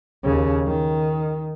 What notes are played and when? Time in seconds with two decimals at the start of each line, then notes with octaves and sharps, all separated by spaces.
0.24 D#2 C#3
0.66 D#3